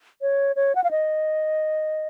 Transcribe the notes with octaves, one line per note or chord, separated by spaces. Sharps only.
C#5
C#5
F#5
F5
D#5